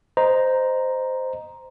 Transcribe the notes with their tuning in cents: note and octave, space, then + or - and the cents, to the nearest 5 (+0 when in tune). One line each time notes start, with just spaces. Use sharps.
C5 -10 D#5 -10 A#5 +5